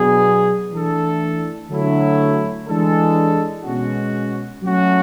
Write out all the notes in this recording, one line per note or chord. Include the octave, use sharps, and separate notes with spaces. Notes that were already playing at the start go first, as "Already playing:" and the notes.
Already playing: B2 F#3 B3 D4 G#4
E3 A3 D4 A4
D3 F#3 A3 E4
E3 G#3 D4 A4
B2 G#3 C#4 F#4
F#3 A3 C#4 F#4